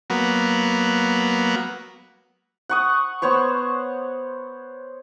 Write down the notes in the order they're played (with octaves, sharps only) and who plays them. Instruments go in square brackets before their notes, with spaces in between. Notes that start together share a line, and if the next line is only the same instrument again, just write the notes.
[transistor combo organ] F#3 A#3 B3
[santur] F#5 C#6 D#6
B3 C5 C#5 C#6